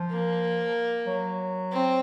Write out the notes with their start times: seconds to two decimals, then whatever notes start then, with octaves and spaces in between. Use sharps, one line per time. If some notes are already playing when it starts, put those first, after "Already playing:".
Already playing: F3
0.11 A#3
1.07 F#3
1.72 C4